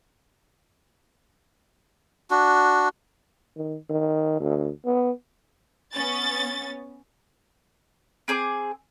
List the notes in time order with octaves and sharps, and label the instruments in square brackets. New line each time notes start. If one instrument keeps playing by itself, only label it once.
[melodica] D4 F#4
[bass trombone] D#3
D#3
D2
B3
[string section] B3 C#4 A6
[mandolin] C4 G#4 G#5 D6